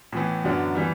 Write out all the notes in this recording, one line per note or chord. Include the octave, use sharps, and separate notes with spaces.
A2 E3 B3
F#2 D3 F#3 B3 D4
E3 G3 B3